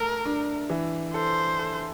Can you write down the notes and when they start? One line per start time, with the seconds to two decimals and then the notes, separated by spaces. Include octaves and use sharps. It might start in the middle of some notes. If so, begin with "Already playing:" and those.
Already playing: A3 A4 A#4
0.25 D4
0.70 E3
1.14 A4 C5
1.59 A4